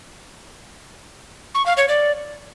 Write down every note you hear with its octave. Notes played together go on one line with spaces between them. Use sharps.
C#6
F5
C#5
D5